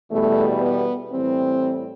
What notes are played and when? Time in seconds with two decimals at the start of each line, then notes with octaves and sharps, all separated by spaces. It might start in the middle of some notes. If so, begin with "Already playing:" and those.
0.11 E2 B2 G3 A3
0.61 B3
1.11 A2 E3 G3 C4